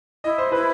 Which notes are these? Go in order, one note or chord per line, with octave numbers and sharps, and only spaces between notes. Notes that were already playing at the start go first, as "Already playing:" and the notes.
E4 D#5
C5
E4 B4